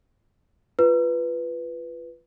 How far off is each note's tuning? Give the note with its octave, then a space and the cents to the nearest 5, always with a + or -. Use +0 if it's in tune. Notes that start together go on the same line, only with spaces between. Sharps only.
F4 -15 B4 +0